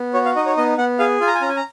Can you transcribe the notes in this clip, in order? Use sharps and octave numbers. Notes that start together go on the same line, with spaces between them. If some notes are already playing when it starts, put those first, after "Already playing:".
Already playing: B3
F#4 C#5
F5
D#4 D#5
C#5
B3 D#5
B3 F#5
G#4 F5
F4 G#5
A#5
G#5
C#4 A#5
G#5
A#5